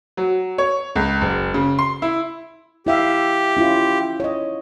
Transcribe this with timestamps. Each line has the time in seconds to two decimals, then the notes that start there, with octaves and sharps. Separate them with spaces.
0.17 F#3
0.58 C#5
0.95 C#2
1.21 F#1
1.54 C#3
1.79 C6
2.02 E4
2.86 E4 G4 E5 F5
3.57 C#4 E4 F4
4.20 C#5 D#5